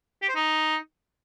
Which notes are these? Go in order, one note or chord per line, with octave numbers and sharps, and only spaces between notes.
G4
C5
D#4